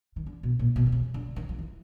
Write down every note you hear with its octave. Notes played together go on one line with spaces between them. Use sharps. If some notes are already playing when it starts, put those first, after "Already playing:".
D#3
D3
B2
A#2
B2
D3
C#3
D3
D#3
F3
E3